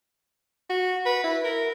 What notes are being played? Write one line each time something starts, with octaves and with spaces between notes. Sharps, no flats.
F#4
B4
E4
A#4